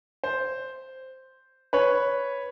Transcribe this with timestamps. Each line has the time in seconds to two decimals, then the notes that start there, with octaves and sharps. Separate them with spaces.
0.24 C5
1.73 B4 C#5